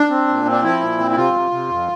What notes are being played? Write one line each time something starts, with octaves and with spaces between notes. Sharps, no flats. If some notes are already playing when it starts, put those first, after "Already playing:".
Already playing: D4
C4
A#2
C4
D4
F3 E4
A#2
C4
E4
C3 F4
C3
C3
F2